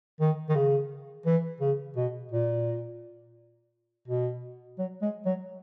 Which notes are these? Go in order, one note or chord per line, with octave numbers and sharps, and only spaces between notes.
D#3
D#3
C#3
E3
C#3
B2
A#2
B2
F#3
G#3
F#3